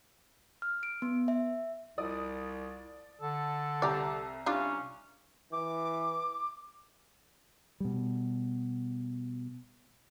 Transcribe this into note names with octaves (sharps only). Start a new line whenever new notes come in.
F6
D7
B3
E5
C2 F3 D5 D#6
D3 A4
C2 G4 D5 A#5
G3 C#4 D4 F4
E3 D6
B2 G3